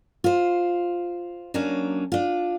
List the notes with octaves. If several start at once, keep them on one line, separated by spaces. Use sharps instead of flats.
F4 C5
F#3 A#3 C#4 D4
D4 F4